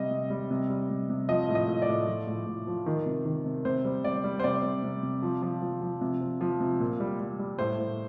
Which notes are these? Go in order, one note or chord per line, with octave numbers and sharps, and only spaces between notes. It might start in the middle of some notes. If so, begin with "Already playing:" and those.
Already playing: C3 G3 D#5
C3
G3
C3
G3
C3
C3
F3 D#5
A2
D#5
A2
D5
A2
F3
A2
A2
F3
D#3
C3
D#3
C3
C3 C5
G3
C3 D5
G3
C5
C3 D5
C3
C3
C3
F3
F3
F3
F3
C3
F3
F3
C3
A#2
G3
G3
G3
A2 C5
A2